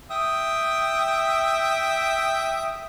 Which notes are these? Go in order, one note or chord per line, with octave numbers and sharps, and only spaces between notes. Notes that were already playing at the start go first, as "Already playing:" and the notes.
E5 G5 D#6